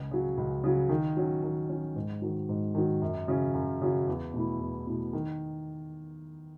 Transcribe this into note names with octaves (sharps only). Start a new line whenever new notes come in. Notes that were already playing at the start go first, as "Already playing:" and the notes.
Already playing: C#2
C#3 F#3
C#2
C#3 F#3
D#3
F#3 C#4
D#3
F#3 C#4
G#2
D#3 F#3
G#2
D#3 F#3
F#2
C#3 F#3 C#4
F#2
C#3 F#3 C#4
E2
B2 A3 E4
E2
B2 A3 E4
D#3